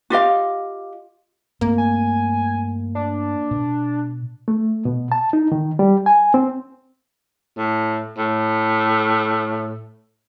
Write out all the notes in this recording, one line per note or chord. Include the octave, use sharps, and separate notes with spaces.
F4 G4 D#5 F5
G2 A3 A#3 C4
G#5
D4
B2
A3
B2
A5
D#4
D#3
G3
G#5
C4
A2
A2